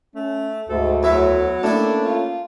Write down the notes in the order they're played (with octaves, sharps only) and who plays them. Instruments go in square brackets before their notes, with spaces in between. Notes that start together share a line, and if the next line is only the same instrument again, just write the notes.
[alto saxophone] A3 [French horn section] C#4
[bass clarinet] D2 [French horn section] G#2 [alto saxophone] A4
[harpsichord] E2 E5 [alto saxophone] F#3 [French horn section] A3 F#4 C#5
[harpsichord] A2 D5 [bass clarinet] A3 [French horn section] A#3 C#4 [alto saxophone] D4
[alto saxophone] F4